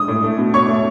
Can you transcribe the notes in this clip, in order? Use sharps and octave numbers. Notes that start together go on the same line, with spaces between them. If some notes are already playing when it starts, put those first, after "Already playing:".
Already playing: G#3 D#6
A2
A3
B2
B2 C#5 C#6
A3